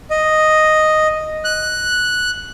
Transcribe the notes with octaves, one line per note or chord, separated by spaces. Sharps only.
D#5
F#6